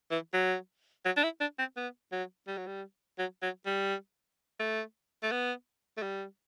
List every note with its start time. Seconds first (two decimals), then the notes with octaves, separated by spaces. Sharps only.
0.11 E3
0.33 F#3
1.05 F#3
1.17 D4
1.23 E4
1.40 D4
1.59 C4
1.76 B3
2.12 F#3
2.47 G3
2.57 F#3
2.67 G3
3.18 F#3
3.42 F#3
3.66 G3
4.59 A3
5.23 A3
5.31 B3
5.97 A3
6.02 G3